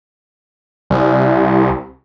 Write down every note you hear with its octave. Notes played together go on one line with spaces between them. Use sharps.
C2